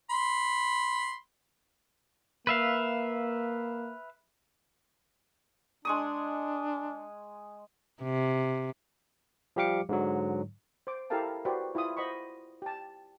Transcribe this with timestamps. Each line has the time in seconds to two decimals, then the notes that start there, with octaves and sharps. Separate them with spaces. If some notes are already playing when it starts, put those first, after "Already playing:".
0.10 B5 C6
2.47 A#3 B4 E5 F5
5.85 G#3 D4 C#6 D#6
8.02 C3
9.56 F3 G3 G4 F5 D6 C#7
9.89 G#2 D3 F#3
10.87 C5 D6
11.10 E4 G4 A4 A#4 F5 A5
11.45 F#4 G4 B4 C5 D5
11.75 E4 F4 B5 D#6
11.97 C5 D#5 F#5 B5 C#6
12.62 G4 A5